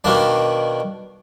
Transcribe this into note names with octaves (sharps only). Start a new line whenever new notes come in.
B2 D#3 A#3 D4